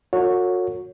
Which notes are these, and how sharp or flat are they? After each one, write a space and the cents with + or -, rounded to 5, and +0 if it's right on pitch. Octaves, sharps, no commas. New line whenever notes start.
F#4 -30 A#4 -45 C#5 +0